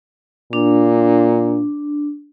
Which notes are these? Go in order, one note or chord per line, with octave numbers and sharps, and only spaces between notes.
A#2 D4